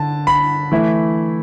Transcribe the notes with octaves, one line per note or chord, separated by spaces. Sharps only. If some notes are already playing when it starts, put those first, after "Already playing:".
Already playing: D3 A5
B5
E3 A3 E4